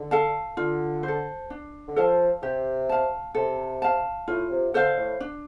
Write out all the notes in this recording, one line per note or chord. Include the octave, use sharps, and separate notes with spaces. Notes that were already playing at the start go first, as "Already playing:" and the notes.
Already playing: D3
A4 F5 A5
D3 F4
C5
A4
D4
D3
F3 A4 F5 A5
C3 G4
F5 A5
C3 A4
F5 A5
A2 F4
C3
D3 A4 C5 F5
A2
D4